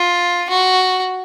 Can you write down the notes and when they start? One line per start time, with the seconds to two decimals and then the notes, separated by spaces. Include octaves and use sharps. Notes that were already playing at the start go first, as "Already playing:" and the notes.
Already playing: F4
0.49 F#4